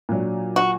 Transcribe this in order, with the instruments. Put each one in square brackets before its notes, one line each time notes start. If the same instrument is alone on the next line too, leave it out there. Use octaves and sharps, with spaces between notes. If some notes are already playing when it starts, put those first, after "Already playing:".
[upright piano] A#2 F#3 D4
[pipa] F#4